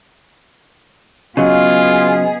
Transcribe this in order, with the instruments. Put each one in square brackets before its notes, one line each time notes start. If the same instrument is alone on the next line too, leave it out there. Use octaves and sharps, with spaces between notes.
[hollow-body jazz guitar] C#3 F#3 [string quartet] B3 G#4 [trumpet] F4 [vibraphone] D#5